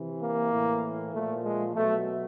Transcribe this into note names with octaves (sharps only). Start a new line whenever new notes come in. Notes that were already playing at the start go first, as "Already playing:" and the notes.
Already playing: C3 E3
A#3
A2 E3
A#2 F3 A3
G#3
B2 F#3 A3